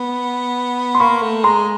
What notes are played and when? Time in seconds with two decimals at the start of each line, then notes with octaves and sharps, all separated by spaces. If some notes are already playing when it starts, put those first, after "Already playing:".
Already playing: B3
0.95 C6
1.00 A#3 B5 C#6
1.22 A3
1.44 G#3 A#5 C6